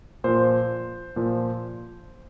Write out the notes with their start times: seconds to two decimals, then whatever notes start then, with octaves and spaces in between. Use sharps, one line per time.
0.24 A#2 F3 C5
1.16 A#2 F3